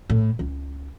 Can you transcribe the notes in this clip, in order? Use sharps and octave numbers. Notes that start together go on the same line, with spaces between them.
A2
C#2